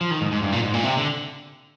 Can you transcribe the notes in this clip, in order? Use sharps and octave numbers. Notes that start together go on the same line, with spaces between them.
F3
D#3
G#2
G#2
G2
A#2
G#2
A#2
C3
D3